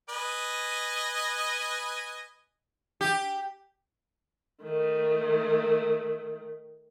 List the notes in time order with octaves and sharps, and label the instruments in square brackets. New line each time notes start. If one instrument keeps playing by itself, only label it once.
[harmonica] B4 D#5 G#5
[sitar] G4
[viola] D#3 A3